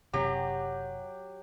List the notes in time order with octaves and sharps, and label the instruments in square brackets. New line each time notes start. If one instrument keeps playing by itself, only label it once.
[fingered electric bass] F#1 C3 [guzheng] F#3 [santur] G4